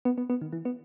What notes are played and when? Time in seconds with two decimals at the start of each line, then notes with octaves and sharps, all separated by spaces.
0.05 B3
0.18 B3
0.30 B3
0.42 D#3
0.53 E3
0.65 B3